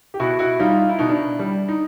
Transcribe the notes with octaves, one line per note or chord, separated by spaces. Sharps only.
G4
B2 E4 F#4
E4 F#4
G3 D#4 F4
F4
E4
B2 D#4
D4 E4
G3
D#4